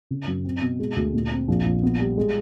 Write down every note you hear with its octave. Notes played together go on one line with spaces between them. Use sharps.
C#3
F#2
C4
B2
G#3
D2
A#2
C4
A#1
A#1
B3
G3
G#3